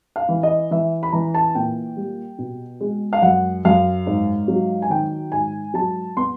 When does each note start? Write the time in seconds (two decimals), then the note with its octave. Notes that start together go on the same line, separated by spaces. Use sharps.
0.16 F5
0.29 E3
0.43 D#5
0.71 E3 E5
1.03 B5
1.12 E3 A#5
1.34 A5
1.55 A#2 G5
1.97 G3
2.38 B2
2.81 G#3
3.13 F5
3.22 F#2 F#5
3.65 F#2 F5
4.07 G#2
4.48 F#3
4.82 G#5
4.90 D#3 G5
5.32 G#2 G#5
5.74 F#3 A5
6.17 B3 C6